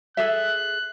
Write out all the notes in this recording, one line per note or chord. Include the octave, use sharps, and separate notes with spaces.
G#4 A4 E5 F#6